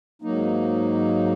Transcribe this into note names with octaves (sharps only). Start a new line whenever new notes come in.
G#2 F#3 A#3 D#4